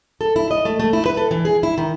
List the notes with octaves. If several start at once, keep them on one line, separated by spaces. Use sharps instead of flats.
A4
E4
D#5
A3
A3
E4
B4
A4
E3
G#4
E4
D#3